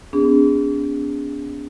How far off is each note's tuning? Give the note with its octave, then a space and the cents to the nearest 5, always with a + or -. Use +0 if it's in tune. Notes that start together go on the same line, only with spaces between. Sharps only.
B3 +30 D4 -35 G#4 -25